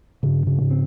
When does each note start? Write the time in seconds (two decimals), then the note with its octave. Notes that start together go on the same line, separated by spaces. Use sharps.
0.23 G2 C#3
0.47 C#3
0.59 G#2
0.71 C4